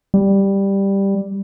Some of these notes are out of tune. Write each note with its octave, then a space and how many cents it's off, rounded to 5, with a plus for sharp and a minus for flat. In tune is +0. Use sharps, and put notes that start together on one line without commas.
G3 +5